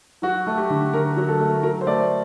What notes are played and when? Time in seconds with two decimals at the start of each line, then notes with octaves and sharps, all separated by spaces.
0.22 F#3 F#4
0.47 A3
0.57 G4
0.70 D3
0.93 D3 A#4
1.16 F#3
1.28 A4
1.40 A3
1.63 F#3 A#4
1.81 C5
1.87 A3 D5